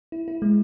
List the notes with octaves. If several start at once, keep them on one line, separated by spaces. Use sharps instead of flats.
E4
E4
G#3